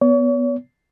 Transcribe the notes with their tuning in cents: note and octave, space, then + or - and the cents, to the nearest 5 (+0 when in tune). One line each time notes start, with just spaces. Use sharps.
B3 +0 C#5 +40